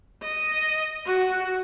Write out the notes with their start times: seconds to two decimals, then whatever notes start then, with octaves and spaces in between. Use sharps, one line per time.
0.23 D#5
1.06 F#4